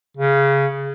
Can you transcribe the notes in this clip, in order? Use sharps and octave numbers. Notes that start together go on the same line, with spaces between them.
C#3